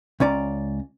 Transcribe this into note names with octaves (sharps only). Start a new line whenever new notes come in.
C#2 C#4 D5 A#5